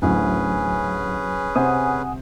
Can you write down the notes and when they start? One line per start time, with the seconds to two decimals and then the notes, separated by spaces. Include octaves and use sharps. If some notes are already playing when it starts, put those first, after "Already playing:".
0.02 A1 D2 F#3 C#4 G#4 B4
1.56 C3 C5 F#5 G#5 D#6